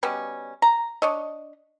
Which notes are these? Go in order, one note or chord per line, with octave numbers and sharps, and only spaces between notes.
B2 G3 B3 C#4
A#5
D4 C#5 D#5